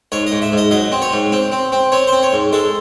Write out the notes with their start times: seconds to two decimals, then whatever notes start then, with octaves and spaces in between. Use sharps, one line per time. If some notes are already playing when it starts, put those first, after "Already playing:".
0.12 G#2 C#5
0.27 D#5
0.32 G#2
0.42 E5
0.52 G#2
0.57 D#5
0.71 F#3 D#5
0.92 C4
1.02 C#5
1.12 G#2
1.32 C4
1.52 C4
1.72 C4
1.92 C4 C#5
2.07 C4 C5
2.23 C#5
2.33 G#2
2.53 G#3 A4